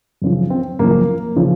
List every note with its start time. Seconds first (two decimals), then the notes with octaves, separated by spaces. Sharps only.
0.22 F#2 C#3 F3
0.50 C4
0.79 F#2 C#3 F3 A#3
1.36 C#3 F3